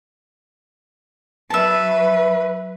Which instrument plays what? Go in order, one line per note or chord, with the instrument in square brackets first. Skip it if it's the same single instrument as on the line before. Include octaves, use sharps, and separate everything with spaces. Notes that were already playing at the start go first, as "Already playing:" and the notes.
[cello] F#3 B4 [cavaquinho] E5 A5